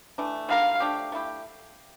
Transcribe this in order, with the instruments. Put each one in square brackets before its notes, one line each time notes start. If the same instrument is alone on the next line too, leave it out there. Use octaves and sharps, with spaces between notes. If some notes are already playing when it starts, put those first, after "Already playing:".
[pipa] E3 A3 D4
[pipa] G3 D4 F4 A#4 [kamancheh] F5
[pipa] F3 A3 D4 G4
A3 E4 G4